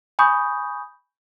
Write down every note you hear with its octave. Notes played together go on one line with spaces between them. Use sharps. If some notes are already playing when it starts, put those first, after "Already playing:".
G#5 B5 C#6 D#6 G6